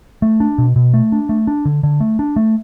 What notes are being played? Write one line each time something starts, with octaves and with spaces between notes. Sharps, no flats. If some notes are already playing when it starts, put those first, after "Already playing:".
A3
D4
B2
B2
A3
D4
A3
D4
D3
D3
A3
D4
A3